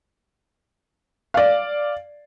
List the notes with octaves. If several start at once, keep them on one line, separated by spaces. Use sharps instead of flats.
D5 F5